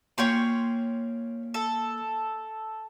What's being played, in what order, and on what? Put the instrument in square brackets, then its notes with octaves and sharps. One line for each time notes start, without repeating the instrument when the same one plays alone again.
[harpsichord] A#2 A#3 C#4 [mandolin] C#5 G5 C6
[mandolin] A4